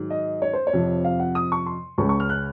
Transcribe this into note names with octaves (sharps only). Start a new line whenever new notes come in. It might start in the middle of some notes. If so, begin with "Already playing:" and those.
Already playing: G#2 D#3 F#3
D#5
C#5
C5
C#5
F2 C3 F3
F5
F#5
D#6
C#6
C6
C#2 C#3 G#3 C#6
C#6
F6
F#6